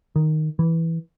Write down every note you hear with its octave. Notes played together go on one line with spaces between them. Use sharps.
D#3
E3